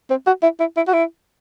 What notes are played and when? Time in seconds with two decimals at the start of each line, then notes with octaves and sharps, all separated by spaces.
0.10 C4
0.27 F#4
0.43 E4
0.60 E4
0.77 E4
0.88 F#4
0.93 E4